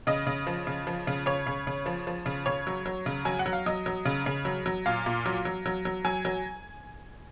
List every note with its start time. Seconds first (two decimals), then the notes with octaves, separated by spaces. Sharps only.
0.07 C#3 D#5
0.27 C#3
0.47 F3
0.67 C#3
0.87 F3
1.07 C#3
1.26 C#3 C#5
1.47 C#3
1.67 C#3
1.86 F3
2.07 F3
2.26 C#3
2.46 C#3 C#5
2.67 F#3
2.86 F#3
3.06 C#3
3.25 F#3 G#5
3.39 F#5
3.46 F#3
3.53 F5
3.66 F#3 D#5
3.86 F#3
4.05 C#3
4.26 C#3
4.45 F#3
4.66 F#3
4.86 A#2 F5
5.06 A#2
5.26 F#3
5.45 F#3
5.66 F#3
5.85 F#3
6.05 F#3 G#5
6.25 F#3